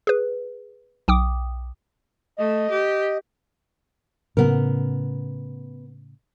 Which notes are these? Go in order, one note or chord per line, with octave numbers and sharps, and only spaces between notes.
G#4 B4
B1 G5 D6 D#6
A3 D#5
G4
A2 C#3 B3 A#4